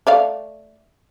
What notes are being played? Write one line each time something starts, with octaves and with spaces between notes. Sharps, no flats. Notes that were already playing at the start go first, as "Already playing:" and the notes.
A3 D5 F5